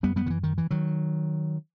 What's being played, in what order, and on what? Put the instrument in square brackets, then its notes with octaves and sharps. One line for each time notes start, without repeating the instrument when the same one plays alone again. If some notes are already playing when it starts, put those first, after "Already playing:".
[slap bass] F#2 G3 B3
G3 B3
D#3
E3
D#3
E3
D#3 F#3